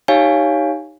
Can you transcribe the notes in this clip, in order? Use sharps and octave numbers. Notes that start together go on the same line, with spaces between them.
D#4 G4 C#5 F5 G#5